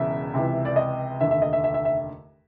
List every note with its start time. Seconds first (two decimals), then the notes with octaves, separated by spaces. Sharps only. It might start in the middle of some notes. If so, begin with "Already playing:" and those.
Already playing: E1 E2 C#3 E5
0.34 C#2 C3 E3
0.65 D5
0.76 D#5
1.20 F1 D#2 D3 E5
1.31 E5
1.42 D#5
1.53 E5
1.64 E5
1.74 E5
1.85 E5